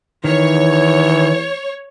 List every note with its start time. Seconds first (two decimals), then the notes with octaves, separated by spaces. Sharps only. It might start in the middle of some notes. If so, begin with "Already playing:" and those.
0.24 D#3 E3 C#5